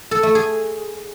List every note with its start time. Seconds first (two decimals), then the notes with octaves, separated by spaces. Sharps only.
0.11 A4
0.23 A3
0.35 G#4